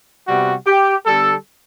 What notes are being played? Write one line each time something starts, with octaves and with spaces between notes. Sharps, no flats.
C3 G3 B3 F#4
G4
D3 G3 B3 A4